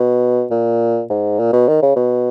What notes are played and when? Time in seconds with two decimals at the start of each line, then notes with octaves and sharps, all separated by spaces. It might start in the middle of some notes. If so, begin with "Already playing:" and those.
Already playing: B2
0.51 A#2
1.10 G#2
1.39 A#2
1.53 B2
1.68 D#3
1.82 C#3
1.96 B2